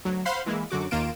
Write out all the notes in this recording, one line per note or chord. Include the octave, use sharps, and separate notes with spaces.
D2 F#3
C5 F5 F#5 B5 C6
E3 G#3 A#3 E4
F#2 D3 F#4 D6
D#2 D#3 A#3 F4 D7 E7